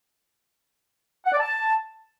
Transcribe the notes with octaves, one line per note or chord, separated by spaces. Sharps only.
F#5
D5
A5